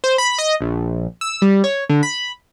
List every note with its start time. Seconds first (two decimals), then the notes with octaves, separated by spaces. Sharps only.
0.04 C5
0.18 B5
0.38 D#5
0.61 A#1
1.21 E6
1.42 G3
1.64 C#5
1.89 D3
2.03 B5